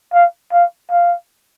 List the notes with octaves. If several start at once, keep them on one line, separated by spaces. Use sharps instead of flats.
F5
F5
F5